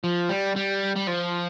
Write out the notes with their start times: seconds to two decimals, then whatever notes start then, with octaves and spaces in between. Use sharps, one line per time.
0.04 F3
0.29 G3
0.56 G3
0.96 G3
1.07 F3